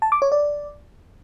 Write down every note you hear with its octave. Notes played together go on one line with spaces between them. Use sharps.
A5
D6
C#5
D5